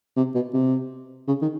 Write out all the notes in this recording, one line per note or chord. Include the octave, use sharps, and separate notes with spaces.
C3
B2
C3
C#3
D#3